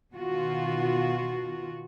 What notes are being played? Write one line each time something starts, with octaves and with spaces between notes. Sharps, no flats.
B2 D#3 F4 F#4